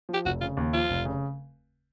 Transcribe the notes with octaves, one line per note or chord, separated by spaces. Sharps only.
F3
G4
F1 F#4
C#3 F4
D#2
F3 F4
F1
C#3